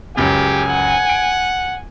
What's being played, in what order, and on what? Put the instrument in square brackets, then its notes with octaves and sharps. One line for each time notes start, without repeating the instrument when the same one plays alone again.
[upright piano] C#2 F#2 C#3 [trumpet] G4 [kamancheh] G#5
[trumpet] F#5
[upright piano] D7